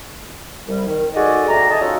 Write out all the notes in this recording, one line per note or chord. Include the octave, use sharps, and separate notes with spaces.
C2 G3
D#3
D#4 F#4 G#4 A4 D5 D#5
D2 A#5
D#5 G#5 A5
C#4 D#4 F4 F#4 A4